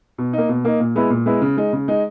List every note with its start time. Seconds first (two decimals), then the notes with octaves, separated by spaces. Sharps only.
0.18 B2
0.33 A#3 D#4
0.49 B2
0.65 A#3 D#4
0.80 A#2
0.96 G#3 B3 E4
1.10 A#2
1.26 G#3 B3 E4
1.42 C#3
1.57 G#3 D#4
1.73 C#3
1.88 G#3 D#4